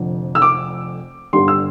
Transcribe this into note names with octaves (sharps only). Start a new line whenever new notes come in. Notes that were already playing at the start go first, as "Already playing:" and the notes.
Already playing: F1 F2 D3
E6
D6
G1 G2 D3 G3 C6
E6